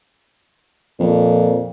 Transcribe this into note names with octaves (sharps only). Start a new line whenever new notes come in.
F2 A#2